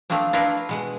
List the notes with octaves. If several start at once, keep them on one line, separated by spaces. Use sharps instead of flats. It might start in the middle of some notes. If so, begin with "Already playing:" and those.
F3 A3 A#3 C4 D4
D4 E4 F4 A#4 B4
B2 G#3 F#5